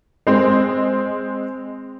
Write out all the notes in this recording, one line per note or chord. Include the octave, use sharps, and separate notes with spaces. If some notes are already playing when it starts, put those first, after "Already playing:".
G#3 C4